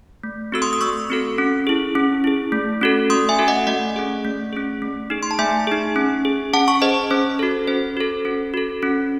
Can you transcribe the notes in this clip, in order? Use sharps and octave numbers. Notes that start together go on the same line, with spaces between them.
A3
C4 F#4 A4 E6
C6 D#6
D#6
A3 C#6 E6
C4 F#4 A4
C#4
E4 G#4
C#4
E4 G#4
A3
C#4 F#4 A4
A3 C6 D#6
E5 G#5
C#4 F#4 A4
D#5 F#5
A3 D#5 F#5
C#4 G#4
A3
C#4 G#4
A3
D#4 G#4
C6
A5
A3 E5 G#5
D#4 G#4
C#4
G#4
C#4 F#5 A5
A5 C#6
G#4 C5 D#5
C#4 C5
F#4 A4
C#4 C5
F#4 A4
C#4
F#4 A4
C#4